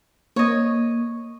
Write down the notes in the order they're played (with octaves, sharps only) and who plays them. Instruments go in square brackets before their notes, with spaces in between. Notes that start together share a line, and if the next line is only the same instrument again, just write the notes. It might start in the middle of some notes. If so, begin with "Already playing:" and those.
[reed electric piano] A#3 [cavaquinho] C#5 D#5